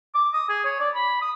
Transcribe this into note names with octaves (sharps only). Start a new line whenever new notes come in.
D6
D#6
G#4
C#5
D5
B5
D#6